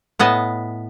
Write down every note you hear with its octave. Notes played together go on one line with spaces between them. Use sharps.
A2 B3 D#5 A5